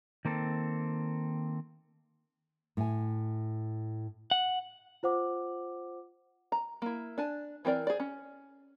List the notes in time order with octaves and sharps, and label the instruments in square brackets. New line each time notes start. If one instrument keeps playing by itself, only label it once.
[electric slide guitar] D#3 A#3 C4 A4
[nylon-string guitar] A2 G#5
[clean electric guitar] F#5
[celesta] F4 C5 F#5 D6
[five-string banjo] A#5
A#3 E4
D4 G#5 A5
E3 C4 A#4 D5
G#4 C5 D5
C#4